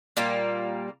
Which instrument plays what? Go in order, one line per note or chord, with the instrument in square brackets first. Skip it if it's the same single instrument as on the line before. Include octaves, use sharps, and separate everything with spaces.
[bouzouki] A#2 G3 A#3